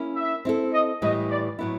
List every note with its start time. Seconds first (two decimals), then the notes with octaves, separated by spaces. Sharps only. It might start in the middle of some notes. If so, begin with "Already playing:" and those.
Already playing: A#3 C#4 E4
0.16 E5
0.45 C4 E4 A4
0.73 D#5
1.02 A2 E3 G3 D#5
1.30 D5
1.59 A2 F#3 B3 E4